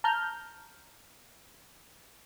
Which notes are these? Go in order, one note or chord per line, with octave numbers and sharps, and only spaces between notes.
A5 A#5 F6 G6